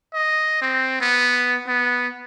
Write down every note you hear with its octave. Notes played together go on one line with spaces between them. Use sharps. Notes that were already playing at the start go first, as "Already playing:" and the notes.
D#5
C4
B3
B3